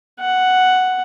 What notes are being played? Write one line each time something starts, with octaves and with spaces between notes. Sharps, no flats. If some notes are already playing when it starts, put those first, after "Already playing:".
F#5